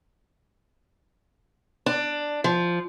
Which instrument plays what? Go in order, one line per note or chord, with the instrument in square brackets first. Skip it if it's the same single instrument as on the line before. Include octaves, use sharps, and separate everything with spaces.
[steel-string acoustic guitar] D4
F3